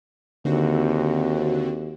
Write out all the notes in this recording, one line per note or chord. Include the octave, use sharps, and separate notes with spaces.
D#2 D3 C4 F#4